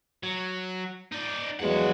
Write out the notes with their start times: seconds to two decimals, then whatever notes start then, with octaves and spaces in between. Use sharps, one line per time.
0.23 F#3
1.12 D#4 D5
1.59 E2 F3 F#3 G#3 F#5